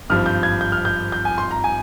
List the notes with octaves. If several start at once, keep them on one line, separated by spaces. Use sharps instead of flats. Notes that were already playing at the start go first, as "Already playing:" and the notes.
G#1 G2 F3 F6
G6
G#6
G6
F6
G6
G6
G#5
C6
A#5
G#5